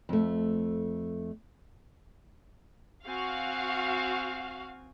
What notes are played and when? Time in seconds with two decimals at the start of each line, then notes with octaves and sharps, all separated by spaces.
0.09 F2 A3
3.05 C4 F#4 F5 G#5